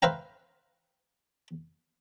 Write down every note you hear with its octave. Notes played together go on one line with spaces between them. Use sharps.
B4 C5 E5 F5 G5 A#5